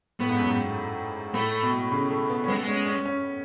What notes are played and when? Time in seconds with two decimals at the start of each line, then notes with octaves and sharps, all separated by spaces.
0.20 A2 B3
0.30 G#2
0.39 F#2
0.49 G#2
1.34 A2 A3
1.63 B2
1.92 C#3
2.10 A3
2.29 B3
2.44 C#4
2.48 G#3 B3
2.56 A3
2.63 G#3 C#4
2.86 C#4
3.05 C#4